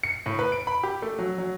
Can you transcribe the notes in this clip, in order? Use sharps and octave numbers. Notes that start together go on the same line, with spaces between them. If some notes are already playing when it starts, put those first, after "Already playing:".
C#7
A2
B4
D7
B5
G4
A3
F#3
F#3